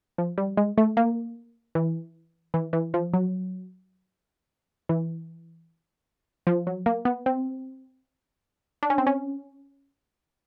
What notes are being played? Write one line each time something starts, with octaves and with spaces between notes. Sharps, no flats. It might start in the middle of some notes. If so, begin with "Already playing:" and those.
F3
G3
G#3
A3
A#3
E3
E3
E3
F3
F#3
E3
F3
F#3
A#3
B3
C4
D4
C#4
C4
C#4